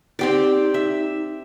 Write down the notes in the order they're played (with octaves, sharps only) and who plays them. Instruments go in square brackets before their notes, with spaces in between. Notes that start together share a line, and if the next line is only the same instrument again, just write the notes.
[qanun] C4 G4 D5 [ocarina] D#4
[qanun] E5